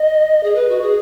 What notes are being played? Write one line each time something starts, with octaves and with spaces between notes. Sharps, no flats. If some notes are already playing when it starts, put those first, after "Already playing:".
Already playing: D#5
G#4
B4
F#4
G#4